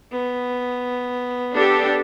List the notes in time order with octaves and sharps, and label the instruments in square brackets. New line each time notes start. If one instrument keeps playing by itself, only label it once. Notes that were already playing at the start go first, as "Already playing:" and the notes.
[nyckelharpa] B3
[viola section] D4 G4 A4